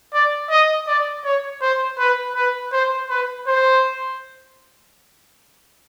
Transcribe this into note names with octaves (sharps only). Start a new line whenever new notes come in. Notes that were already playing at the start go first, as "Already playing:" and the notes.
D5
D#5
D5
C#5
C5
B4
B4
C5
B4
C5